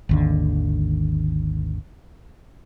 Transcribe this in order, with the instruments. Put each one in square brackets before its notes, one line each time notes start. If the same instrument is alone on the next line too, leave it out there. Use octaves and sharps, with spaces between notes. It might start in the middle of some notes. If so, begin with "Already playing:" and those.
[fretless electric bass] G#1 D#2 D3